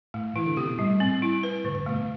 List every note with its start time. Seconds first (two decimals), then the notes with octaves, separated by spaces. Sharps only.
0.14 A2 A3
0.36 E3 E4
0.46 D3
0.57 C3 G4
0.67 B2
0.78 A2 G3
1.00 C4
1.22 E4
1.43 B4
1.64 A2 D3
1.75 G2
1.86 B2 A3
1.97 A2